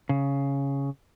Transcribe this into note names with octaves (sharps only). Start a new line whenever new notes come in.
C#3